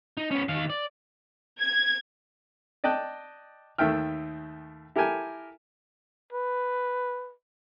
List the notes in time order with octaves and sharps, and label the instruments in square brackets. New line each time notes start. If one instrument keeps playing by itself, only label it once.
[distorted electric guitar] D#4
B3 C#4
D#3 F5
D5
[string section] G#6
[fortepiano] D5 D#5 G5 A5 F#6
D#2 D#3 A3 E5 G5 F6
E4 G4 A4 A#4 G5 G#5
[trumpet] B4